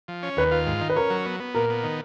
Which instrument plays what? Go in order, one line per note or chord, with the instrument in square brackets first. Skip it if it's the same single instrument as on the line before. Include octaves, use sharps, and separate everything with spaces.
[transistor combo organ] F3
C#4
[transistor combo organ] D#2 [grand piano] B4
[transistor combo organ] F4
G#2
D#3
[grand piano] B4
[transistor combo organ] C#4 [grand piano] A#4
[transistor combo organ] F#3
B3
B3
[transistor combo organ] A#2 [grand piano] A#4
[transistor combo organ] B3
D#3